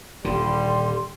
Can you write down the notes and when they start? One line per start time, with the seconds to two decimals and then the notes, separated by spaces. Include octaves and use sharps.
0.25 D#1 D3 G3 C6